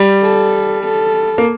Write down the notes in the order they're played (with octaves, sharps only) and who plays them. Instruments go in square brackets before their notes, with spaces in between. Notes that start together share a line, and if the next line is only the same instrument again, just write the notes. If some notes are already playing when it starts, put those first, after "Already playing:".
Already playing: [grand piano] G3
[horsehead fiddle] A4
A4
[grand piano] A#3